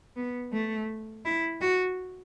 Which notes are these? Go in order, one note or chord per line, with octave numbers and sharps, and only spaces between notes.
B3
A3
E4
F#4